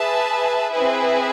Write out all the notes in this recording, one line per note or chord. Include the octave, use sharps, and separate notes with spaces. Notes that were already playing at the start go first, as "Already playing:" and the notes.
Already playing: G#4 B4 E5 A5
C4 E4 G#4 B4 E5